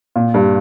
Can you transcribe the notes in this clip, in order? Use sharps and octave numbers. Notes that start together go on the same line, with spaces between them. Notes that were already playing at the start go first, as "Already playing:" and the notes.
A#2
G2